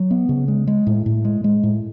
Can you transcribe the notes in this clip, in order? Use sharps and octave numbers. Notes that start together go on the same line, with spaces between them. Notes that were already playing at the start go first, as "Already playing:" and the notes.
Already playing: F#3
B3
C#3
G#3
G#3
A2
A2
G#3
G#3
A2